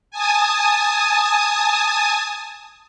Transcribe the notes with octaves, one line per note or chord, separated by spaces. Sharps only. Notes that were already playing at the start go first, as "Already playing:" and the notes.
G#5 A5 D#6